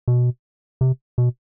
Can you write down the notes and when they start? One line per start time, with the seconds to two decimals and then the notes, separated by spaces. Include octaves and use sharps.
0.08 B2
0.81 C3
1.18 B2